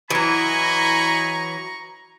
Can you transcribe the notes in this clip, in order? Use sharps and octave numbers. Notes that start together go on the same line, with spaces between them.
E3 F#3 D#5 G#5 A#5 B5 C#6